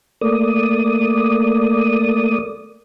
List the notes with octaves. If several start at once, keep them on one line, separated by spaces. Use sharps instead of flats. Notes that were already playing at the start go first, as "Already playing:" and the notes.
A3 A#3 D5 D#6